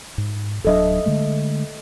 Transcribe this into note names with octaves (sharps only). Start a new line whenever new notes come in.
G#2
D1 F#3 D4 A4 D#5 E5
D3 G#3 A3